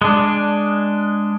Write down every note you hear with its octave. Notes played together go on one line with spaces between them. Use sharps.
G#3 D4